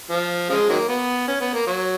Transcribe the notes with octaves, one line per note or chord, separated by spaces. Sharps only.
F3
C#3 F3 G#3
D#3 F#3 A#3
B3
C#4
B3
A#3
F#3